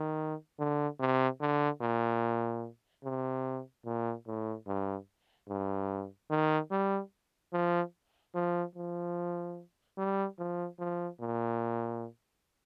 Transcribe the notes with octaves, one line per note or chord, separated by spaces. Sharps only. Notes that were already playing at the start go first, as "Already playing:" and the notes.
Already playing: D#3
D3
C3
D3
A#2
C3
A#2
A2
G2
G2
D#3
G3
F3
F3
F3
G3
F3
F3
A#2